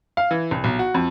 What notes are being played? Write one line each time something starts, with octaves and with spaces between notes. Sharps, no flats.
F5
E3
C2
B1
F#4
F2